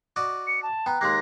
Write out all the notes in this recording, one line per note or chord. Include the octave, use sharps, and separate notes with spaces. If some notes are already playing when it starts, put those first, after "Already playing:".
F#4 D5 D#5
C#7
A5
B3 G5 A#5 F#6
D#2 G#3 A#3 C6 F#6 A#6